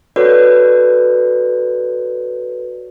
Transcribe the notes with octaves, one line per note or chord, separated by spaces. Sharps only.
F#4 A4 B4 C#5 D5